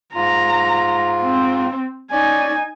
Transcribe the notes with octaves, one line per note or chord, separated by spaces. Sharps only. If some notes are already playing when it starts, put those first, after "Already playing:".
G#2 F4 A#5
C4
C#4 D#4 D5 G#5